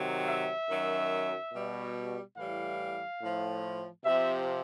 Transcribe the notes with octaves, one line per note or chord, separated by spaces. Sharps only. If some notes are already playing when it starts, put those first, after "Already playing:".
Already playing: C3 D#3 F#3
E5
F#2 D#3 F#3
B2 G3
A2 E3 G3 F5
A2 F3
C3 F3 E5